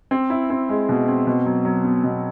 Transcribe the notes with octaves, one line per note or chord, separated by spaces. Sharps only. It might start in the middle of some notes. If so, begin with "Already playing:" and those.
C4
E4
C4
G#3
B2
C4
B2
F#3
F#3
B3
B2